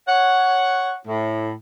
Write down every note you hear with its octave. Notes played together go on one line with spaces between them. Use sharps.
C#5 F#5
A2